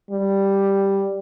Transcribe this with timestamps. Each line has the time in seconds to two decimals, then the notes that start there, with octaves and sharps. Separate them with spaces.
0.11 G3